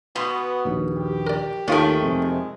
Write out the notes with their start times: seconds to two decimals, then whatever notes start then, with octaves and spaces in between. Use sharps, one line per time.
0.16 B2 B3 A#5 C6
0.65 A#1 D#2
0.97 G4
1.27 A#4 D5
1.68 D#2 D#3 A3 C#4 F4 A#4
2.02 F2 C3 G#3